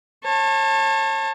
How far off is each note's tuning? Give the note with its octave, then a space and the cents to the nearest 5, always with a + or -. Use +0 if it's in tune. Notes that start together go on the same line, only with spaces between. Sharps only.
C#5 -35 A5 +15